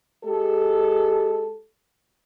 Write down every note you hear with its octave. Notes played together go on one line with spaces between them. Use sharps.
G#3 G4 A4